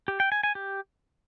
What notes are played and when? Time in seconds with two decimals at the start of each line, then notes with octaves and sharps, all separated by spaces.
0.08 G4
0.20 G5
0.32 G#5
0.43 G#5
0.55 G4